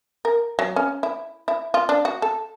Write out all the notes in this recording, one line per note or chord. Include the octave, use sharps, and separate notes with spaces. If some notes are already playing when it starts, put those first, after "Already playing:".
A#4
F#3
C#4
E4
E4
F4
D4
F#4
A4